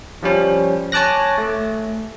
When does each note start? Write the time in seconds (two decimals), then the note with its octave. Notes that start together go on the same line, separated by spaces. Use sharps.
0.23 F3 G3 C#4
0.92 C#5 G#5 A5 D6 F#6 A#6
1.38 A3